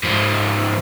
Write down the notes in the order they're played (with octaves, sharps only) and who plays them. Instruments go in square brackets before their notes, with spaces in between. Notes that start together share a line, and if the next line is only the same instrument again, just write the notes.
[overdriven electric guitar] G#2 F3